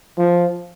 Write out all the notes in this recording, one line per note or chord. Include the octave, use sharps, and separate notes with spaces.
F3